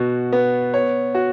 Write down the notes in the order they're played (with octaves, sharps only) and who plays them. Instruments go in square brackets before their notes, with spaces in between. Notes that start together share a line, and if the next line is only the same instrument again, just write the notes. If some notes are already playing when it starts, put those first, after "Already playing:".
Already playing: [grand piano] B2 F#4
B3
C#5
F#4